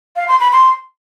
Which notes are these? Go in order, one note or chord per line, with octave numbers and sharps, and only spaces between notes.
F5
C6
B5
C6